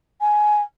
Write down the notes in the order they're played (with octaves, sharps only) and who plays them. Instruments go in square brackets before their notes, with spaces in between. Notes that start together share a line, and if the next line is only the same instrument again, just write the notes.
[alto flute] G#5